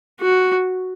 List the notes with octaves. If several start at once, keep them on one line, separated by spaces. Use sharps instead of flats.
F#4